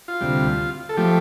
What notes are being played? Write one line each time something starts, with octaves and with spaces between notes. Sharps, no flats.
F4
D2 C3 G3
A4
F3 A3 G4